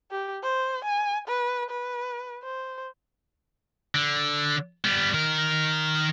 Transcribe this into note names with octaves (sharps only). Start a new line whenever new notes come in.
G4
C5
G#5
B4
B4
C5
D3
G3 B3
D#3 A#4